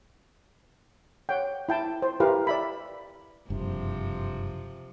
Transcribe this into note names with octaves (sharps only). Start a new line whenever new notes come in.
C#5 F#5 G5
E4 G5 A5
C5
E4 G4 A#4 B4 F5
D5 E5 B5
F#1 G2 C3 F3